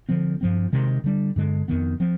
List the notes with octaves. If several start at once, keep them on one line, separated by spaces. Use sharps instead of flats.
D3 F3 C4
G2 F3 C4
C3 D#3 G#3
D3 G3 D4
G2 D3 G#3
F2 D#3 B3
F3 C4